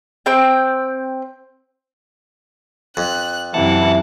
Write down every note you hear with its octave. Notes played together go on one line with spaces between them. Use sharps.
C4 G5
F2 F#6
F#2 C3 E3 E5 F#5 A5